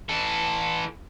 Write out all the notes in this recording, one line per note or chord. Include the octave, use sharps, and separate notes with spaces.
E3 A4